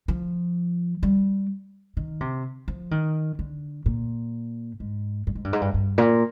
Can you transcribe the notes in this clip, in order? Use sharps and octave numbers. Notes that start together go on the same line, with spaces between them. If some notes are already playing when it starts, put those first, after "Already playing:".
F3
G3
D#3
C3
F3
D#3
D3
A#2
G#2
G2
G#2
G2
G#2
G2
G2
A#2